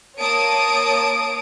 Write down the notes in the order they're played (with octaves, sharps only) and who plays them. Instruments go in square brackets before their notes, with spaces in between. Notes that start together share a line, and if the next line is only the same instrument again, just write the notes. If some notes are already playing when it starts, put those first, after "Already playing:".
[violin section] A#3 C#5 A5 D#6 D7